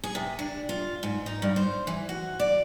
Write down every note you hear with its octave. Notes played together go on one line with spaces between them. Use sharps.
G#4
C3
D4
F4
G#2
D#4
G2
C5
E3
F#4
D5